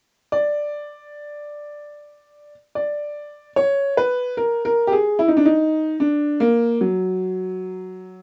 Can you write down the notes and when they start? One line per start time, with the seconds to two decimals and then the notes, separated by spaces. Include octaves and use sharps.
0.32 D5
2.75 D5
3.56 C#5
3.97 B4
4.37 A#4
4.65 A#4
4.87 G4
4.92 G#4
5.19 E4
5.28 D#4
5.37 D4
5.45 D#4
6.00 D4
6.40 A#3
6.81 F#3